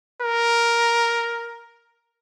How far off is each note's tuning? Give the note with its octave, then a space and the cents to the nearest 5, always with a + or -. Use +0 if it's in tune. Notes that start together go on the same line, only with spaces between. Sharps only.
A#4 +5